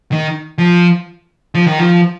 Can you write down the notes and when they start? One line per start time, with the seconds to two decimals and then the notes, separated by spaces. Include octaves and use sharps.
0.12 D#3
0.58 F3
1.55 F3
1.67 D#3
1.79 F3